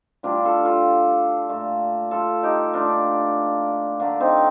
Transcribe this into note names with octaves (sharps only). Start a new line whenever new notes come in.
A2 G3 D4 F4
F4 A4
F4 A4
A#2 A3
F4 A4
D#4 G4
A#2 A3 D4 F4
D3 A3 A#3 D4
C4 D#4